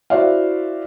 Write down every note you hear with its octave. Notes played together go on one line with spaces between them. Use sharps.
E4 F#4 C5 D5 E5 F5